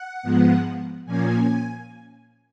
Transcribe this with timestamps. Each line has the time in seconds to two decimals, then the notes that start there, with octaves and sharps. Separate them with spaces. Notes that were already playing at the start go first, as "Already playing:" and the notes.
Already playing: F#5
0.23 G#2 F3 G#3 B3
1.06 A#2 F3 A#3 C#4 G#5